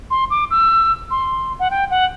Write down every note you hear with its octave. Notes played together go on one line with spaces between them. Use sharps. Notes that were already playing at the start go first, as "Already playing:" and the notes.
C6
D6
E6
C6
F#5
G5
F#5